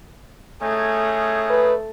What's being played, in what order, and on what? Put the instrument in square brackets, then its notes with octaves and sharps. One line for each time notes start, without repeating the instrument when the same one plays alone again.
[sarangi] A3 [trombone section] C#4 D#4 G#4
[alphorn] B4